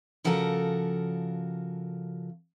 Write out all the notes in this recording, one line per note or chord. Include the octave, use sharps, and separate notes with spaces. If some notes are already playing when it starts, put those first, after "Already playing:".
C#3 F3 F#4 A4 A#4